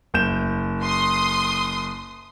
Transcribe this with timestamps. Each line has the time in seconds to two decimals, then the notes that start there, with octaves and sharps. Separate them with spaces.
0.14 F#1 G6 E7
0.82 C6 D#6